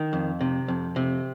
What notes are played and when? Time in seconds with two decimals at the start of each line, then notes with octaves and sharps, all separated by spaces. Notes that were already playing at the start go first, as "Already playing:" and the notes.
Already playing: D#3
0.13 F2
0.41 C3
0.68 F2
0.96 C3